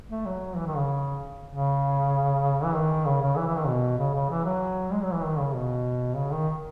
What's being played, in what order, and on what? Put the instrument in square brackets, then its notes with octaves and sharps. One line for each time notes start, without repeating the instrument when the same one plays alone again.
[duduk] A3
F#3
E3
D#3
C#3
C#3
E3
D#3
C#3
C#3
E3
E3
D#3
B2
C#3
C#3
E3
F#3
G#3
F#3
E3
D#3
C#3
B2
C#3
D#3